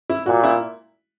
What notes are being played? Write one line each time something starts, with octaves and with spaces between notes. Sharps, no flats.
E4
A#2 F#4
E4